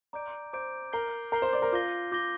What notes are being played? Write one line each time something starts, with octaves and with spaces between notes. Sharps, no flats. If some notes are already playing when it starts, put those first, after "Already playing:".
D5 A#5 D6 G6 D7
C5 A#5 D6 G6 D7
A#4 G6 C7 G7
A#4 G6 C7 G7
C5
D5
A#4
F4 D6 G6 A#6 G7
F4 D6 G6 A#6 G7